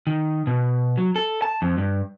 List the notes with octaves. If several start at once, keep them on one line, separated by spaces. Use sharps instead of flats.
D#3
B2
F#3
A4
A5
F2
G2